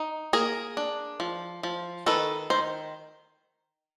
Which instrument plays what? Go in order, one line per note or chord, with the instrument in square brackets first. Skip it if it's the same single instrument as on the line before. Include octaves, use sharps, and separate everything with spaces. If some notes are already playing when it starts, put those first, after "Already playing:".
Already playing: [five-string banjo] D#4
A#3 G#4 A#4
D4
F3
F3
D#3 A4 B4
D#3 C5